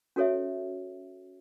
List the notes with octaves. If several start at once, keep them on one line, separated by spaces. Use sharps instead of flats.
C#4 F#4 A4 C#5 E5